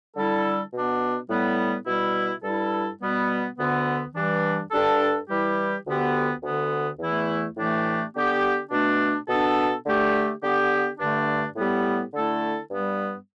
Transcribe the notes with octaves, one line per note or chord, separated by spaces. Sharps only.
D3 G3 E4 A4
B2 B3 D4
A2 G3 B3
B2 G3 E4
G2 G3 E4 A4
B2 G3 B3
D2 D3 B3
G2 E3 G3 D4
G2 G3 D4 A4
E3 G3 E4 G4
D2 D3 B3 G4
D2 D3 B3
E2 E3 A3 E4
A2 E3 A3 D4 G4
D3 B3 G4
B2 A3 D4
B2 B3 D4 A4
D3 A3 G4
D3 B3 G4
G2 D3 A3 D4
A2 G3 B3 G4
D3 A3 E4 A4
G2 G3 B3